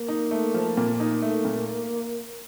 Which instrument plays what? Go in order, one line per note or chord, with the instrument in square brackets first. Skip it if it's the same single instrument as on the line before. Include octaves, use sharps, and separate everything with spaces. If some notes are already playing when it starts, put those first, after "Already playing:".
Already playing: [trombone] A#3
[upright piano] D#4
A3
F3
A#2
D#4
A3
A#2